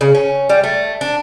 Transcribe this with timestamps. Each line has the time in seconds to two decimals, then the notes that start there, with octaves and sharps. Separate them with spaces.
0.01 C#3
0.15 C#4
0.49 G3
0.64 A3
1.01 D4